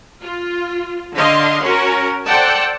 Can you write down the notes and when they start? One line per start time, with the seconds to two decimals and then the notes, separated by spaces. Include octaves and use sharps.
0.21 F4
1.16 D3 D#5 F5 C6
1.61 C#4 F#4 A#4
2.25 A4 C5 D5 F#5 G5 A5